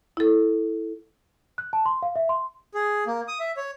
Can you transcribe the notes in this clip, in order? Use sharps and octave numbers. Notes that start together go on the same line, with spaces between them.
E4 A4
F#6
A5
C6
F5
E5
C6
G#4
A#3
D#6
E5
C#5